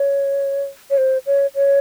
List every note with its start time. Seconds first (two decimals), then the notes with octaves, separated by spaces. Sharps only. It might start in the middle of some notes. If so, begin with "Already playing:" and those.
Already playing: C#5
0.90 C#5
0.98 C5
1.26 C#5
1.55 C#5